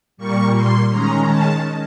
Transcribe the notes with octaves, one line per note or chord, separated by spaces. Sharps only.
A#2 G3 A#3 C#6
C6
D#3 G#3 C#4 A#5
A5